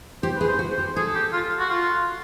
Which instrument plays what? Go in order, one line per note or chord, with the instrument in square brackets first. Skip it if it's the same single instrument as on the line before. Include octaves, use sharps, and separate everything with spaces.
[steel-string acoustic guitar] G4 [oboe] C5
[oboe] B4
[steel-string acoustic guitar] G#4
[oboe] C5
[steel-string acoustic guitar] F#4
[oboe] C5
[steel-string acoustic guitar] G4
[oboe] G#4 [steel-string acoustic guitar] A4
[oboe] G4
F4
F#4
F4